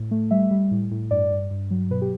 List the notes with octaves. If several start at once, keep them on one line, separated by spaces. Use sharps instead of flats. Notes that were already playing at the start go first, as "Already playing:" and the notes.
Already playing: A2
A3
G3 E5
G3
A2
A2
G2 D5
G2
G2
F#3
B2 B4
G4